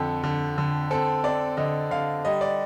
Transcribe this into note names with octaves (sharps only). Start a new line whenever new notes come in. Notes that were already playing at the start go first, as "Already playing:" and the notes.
Already playing: F2 D3 A4
D3
D3
C4 A4
C4 D5
D3 D#5
D3 F5
G3 D#5
D5